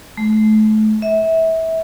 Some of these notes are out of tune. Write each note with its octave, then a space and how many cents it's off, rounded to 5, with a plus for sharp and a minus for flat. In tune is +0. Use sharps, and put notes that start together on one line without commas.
A3 -30
E5 -25